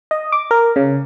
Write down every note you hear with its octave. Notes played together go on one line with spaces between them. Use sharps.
D#5
D6
A#4
C#3